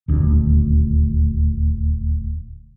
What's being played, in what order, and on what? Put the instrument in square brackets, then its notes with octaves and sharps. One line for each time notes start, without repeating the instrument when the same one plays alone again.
[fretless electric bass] D#1 D2